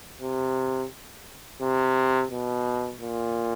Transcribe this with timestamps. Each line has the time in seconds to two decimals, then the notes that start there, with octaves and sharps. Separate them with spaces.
0.21 C3
1.61 C3
2.31 B2
3.01 A#2